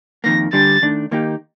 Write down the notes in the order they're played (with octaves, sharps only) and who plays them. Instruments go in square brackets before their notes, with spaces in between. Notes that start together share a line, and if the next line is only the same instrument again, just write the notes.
[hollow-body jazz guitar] F2 D#3 A#3 [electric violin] A#6
[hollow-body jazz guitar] D3 G3 D4 G4 [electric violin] A6
[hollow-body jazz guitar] D#3 A3 D4
D#3 A#3 D#4 G4